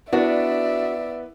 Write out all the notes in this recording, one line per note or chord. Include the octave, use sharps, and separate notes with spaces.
B3 D4 E4 F#4 D5 E5